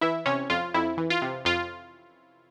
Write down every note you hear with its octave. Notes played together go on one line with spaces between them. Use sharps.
E3 E4 E5
C3 C#4 C#5
F2 F4
F2 E4
E3
F4
C3
F2 F4